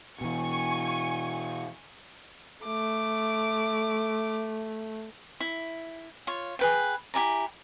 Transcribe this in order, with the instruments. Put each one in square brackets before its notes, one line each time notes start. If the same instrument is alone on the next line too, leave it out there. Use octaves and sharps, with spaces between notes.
[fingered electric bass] B2 E3 [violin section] G#5 C#6
[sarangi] A3 [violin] D6
[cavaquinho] E4
F4 C#5
G#4 B4 G5
E4 G4 G#5 A#5